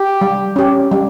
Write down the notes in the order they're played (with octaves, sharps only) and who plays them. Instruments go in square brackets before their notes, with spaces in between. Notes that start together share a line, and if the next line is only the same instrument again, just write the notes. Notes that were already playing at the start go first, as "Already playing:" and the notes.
Already playing: [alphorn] G4
[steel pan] G3
C#4 G4
G3